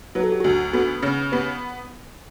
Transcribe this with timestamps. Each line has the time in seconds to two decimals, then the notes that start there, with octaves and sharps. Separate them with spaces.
0.15 F#3 B4
0.23 A4
0.32 G4
0.40 D2 F#4 A4
0.73 B3 F#4 A4
1.03 C#3
1.32 B3 G4 B4